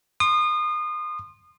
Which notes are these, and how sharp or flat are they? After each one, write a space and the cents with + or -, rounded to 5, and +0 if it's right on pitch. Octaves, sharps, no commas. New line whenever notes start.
C6 +10 D#6 -30